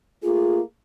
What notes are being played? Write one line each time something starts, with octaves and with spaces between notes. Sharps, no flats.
A3 A#3 F4 G#4